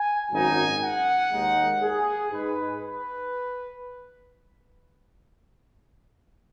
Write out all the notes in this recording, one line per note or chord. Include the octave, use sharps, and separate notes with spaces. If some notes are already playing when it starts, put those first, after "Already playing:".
Already playing: G#5
G#1 F#2 F#3 D#4 G#5
F#5
D#2 D#3 G#3 D#4
G#4
G#2 G#3 D#4 B4
B4